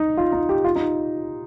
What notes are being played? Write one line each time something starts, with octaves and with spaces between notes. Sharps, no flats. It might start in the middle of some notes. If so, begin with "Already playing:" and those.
Already playing: D#4
F4
D#4
G4
F4
D#4